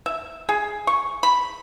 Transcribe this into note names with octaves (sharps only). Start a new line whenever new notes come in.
E5
G#4
C#6
B5